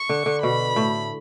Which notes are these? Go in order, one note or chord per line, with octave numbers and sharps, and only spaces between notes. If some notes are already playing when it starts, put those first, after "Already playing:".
Already playing: C#6
D3
D3
B2 B5
A2